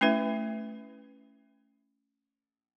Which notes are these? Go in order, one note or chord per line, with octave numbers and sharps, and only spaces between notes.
A3 C#4 E4 B4 E5